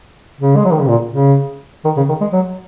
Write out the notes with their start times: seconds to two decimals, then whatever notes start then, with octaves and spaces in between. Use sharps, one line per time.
0.41 C#3
0.56 G#3
0.65 F#3
0.72 D#3
0.81 C#3
0.89 A#2
1.13 C#3
1.85 D#3
1.97 C#3
2.09 D#3
2.21 G#3
2.33 F#3